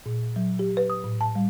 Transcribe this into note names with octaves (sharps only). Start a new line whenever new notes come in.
A#2
F#3
G4
B4
D#6
A2
A5
G3